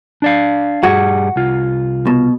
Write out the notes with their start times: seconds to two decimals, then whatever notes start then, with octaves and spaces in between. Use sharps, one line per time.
0.22 D4 D5 F5
0.83 G2 G3 F#4 G#4
1.36 C2 F4
2.07 B2